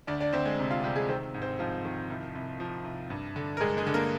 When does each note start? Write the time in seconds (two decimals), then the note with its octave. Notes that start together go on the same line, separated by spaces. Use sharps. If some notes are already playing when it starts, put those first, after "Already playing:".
0.07 D2 D4 D5
0.20 D4 D5
0.33 D2 C4 C5
0.45 G#3 G#4
0.59 C3
0.71 F4 F5
0.83 C3 G3 G4
0.96 G#3 G#4
1.09 D#3 C4 C5
1.34 G#2
1.42 C4 C5
1.59 G#2 F3 F4
1.85 D#3
2.10 C2
2.35 C2
2.60 F3
2.85 C2
3.10 G2
3.36 D3
3.57 A#4
3.60 G2 G#3 G#4
3.77 G#3 G#4
3.87 D3
3.94 A#3 A#4